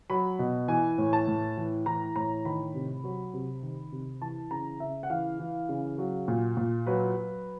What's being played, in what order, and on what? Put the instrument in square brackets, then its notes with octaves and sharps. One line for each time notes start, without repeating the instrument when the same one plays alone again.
[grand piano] F#3 B5
B2
E3 G#5
A2
A5
A2
E3
E3 A#5
A2 A#5
D#3 B5
C3
F#3
C3
D#3
C3
E3 A5
C#3 A#5
C#3 E5
F#5
E3 F5
E3
C#3
F#3
A#2
A#2
F#3 B4
F#3